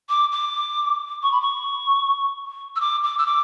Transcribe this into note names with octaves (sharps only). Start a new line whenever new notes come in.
D6
D6
C#6
B5
C#6
E6
D6
D6
E6
D6